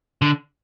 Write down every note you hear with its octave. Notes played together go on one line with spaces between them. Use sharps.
D3